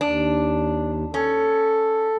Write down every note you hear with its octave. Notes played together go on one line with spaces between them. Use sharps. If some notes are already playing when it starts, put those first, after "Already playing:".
D#2 D4
C#4 A4